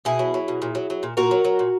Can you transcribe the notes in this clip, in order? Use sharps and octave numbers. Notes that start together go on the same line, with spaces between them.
B2 E4 G#4
F#3
F#3
B2
A#2
F#3
F#3
A#2
A#2 F#4 A#4
F#3
F#3
A#2